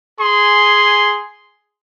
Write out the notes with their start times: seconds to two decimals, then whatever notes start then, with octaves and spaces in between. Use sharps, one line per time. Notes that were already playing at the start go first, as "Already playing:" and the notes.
0.20 G#4 G#5 C6